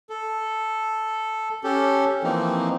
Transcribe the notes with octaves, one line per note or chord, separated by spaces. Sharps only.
A4
C#4 G4 A4
E3 F3 A#3 C4 D#4